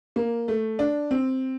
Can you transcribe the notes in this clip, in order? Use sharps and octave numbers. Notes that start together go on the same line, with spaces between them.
A#3
A3
D4
C4